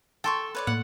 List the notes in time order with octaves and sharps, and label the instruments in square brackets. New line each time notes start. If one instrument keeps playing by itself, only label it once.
[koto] A4 [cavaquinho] G5 C6 C#6
[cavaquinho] B4 C#5 D5
[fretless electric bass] A2 A#3 [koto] F#5